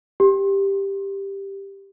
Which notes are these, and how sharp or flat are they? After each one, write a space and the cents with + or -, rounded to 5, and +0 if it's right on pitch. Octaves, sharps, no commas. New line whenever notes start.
G4 +5